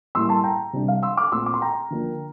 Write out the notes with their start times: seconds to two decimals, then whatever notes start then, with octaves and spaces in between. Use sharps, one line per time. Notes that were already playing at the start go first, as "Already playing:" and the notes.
0.15 A2 G3 A#3 E4 C6 E6
0.29 A5 C6
0.44 G5 A#5
0.73 C3 G3 D4
0.88 F5
1.03 C6 E6
1.17 D6 F6
1.32 A#2 A3 C4 C6 E6
1.46 D6
1.54 C6
1.62 G5 A#5
1.90 D3 F3 A#3 D4